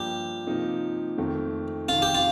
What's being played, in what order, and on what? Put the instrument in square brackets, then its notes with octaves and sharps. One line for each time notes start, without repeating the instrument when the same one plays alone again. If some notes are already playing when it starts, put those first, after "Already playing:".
Already playing: [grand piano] G2 F3 A#3 [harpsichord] G4
[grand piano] C3 F3 A#3 D#4
F2 D#3 A3 C4
[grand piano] F2 C3 D#3 [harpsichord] F4
[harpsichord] G4
F4